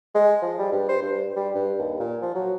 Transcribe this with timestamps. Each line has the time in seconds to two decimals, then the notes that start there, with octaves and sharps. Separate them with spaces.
0.15 G#3
0.42 F3
0.59 G3
0.72 G2
0.89 C5
1.02 G2
1.36 G3
1.55 G2
1.79 D#2
2.00 A#2
2.22 F3
2.35 F#3